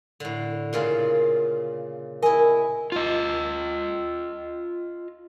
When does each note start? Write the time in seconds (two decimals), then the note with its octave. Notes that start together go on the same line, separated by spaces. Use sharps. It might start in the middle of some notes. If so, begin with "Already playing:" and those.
0.20 A2 D3
0.73 A#2 C#3 F4
2.22 E4 A#4 D#5 G#5
2.92 F4 D#5